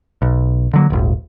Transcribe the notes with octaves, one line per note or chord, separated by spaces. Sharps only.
B1
D3 F#3 A#3
D#1 G#1